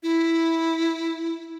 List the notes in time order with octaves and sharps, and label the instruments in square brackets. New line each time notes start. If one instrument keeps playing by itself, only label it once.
[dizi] E4